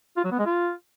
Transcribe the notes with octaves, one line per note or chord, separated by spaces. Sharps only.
F4
F#3
B3
G#3
F4